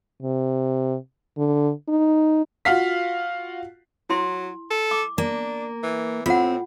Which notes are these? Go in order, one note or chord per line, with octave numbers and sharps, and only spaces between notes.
C3
D3
D#4
F4 F#4 F5 B6
F#3 E4 C6
A4
D6
A#3 D4
E3
A2 C4 F4 F#5